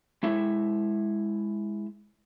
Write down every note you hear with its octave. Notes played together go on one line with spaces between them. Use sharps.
G#3 E4 E5